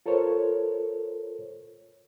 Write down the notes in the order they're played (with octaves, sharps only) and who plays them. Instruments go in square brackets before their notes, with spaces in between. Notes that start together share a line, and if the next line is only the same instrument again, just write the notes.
[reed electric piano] F4 A4 A#4 C5 C#5